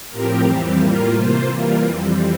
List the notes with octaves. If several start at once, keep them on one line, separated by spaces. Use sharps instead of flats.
A2 F3 C4 G4 A#4
F2 E3 G3 C4 G4
A2 G3 A#3 F4 A#4
C3 E3 A#3 F4 C5
E3 G3 A#3 F4 A#4
F2 E3 G3 C4